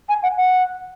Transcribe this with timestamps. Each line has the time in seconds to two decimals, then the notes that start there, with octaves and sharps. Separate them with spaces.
0.09 G#5
0.23 F#5
0.37 F#5